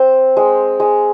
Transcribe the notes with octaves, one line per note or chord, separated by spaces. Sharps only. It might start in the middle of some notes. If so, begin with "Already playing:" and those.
Already playing: C4 C5
G#3
G#3